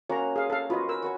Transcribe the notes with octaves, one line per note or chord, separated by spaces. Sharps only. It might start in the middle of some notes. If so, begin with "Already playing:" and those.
A#3 C#4 F#4 C#5 A#5
G#4 F5
A4 F5
F4 F#4 B4 D#5
A#4 E6
F#4 B4 C#5